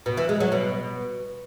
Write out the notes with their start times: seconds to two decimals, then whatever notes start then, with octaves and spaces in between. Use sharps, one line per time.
0.06 B2
0.17 E3
0.29 G#3
0.40 F#3
0.52 B2